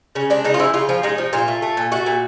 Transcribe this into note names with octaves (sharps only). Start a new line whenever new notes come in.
C#3 C#4
G#3 D4
C#3 D#4
F4
F3 E4
C#3 F4
F3
G#3 D#4
F3
A#2 F4
A3
A3
A#2
A3 F#4
A#2